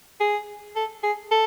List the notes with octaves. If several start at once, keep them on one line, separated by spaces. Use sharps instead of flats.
G#4
A4
G#4
A4